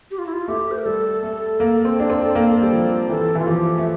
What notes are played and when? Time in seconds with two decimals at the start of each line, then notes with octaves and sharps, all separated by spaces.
0.11 G4
0.18 F4
0.26 E4
0.33 F4
0.48 A3 G4
0.71 C5
0.78 A#4
0.85 G3 A4
1.23 A3 A4
1.60 A#3
1.85 C4
2.00 D4
2.10 C4
2.35 A#3
2.62 G3
2.73 F3
3.09 E3 A4
3.35 E3 F4
3.47 F3 G4
3.78 A3